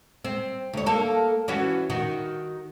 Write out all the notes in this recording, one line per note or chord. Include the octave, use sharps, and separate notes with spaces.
C4
D2 C#5
A#3 A4
E3 C#4 F#4
D#3 F#4